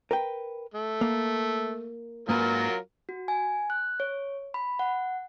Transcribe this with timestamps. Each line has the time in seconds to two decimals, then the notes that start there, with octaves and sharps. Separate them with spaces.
0.11 A#4 B4 G5
0.74 A3
1.01 A#3
2.29 G#2 F#3 A#3 F4 A#4 B4
3.09 F#4
3.28 G#5
3.70 F#6
4.00 C#5
4.54 B5
4.79 F#5